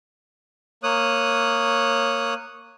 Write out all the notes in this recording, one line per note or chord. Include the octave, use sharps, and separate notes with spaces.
A#3 C#5 D#6 F#6